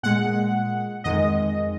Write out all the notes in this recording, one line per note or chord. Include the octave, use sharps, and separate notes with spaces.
A#2 G#3 F#5
F2 D#3 G#3 D#5